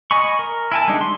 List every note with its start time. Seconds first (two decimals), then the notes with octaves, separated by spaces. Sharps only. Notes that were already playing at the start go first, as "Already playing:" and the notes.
0.11 D#5 G#5 B5 C#6
0.39 A#4
0.72 E4 G#5 A5
0.88 G3 G#3 D4 D#4
1.01 C6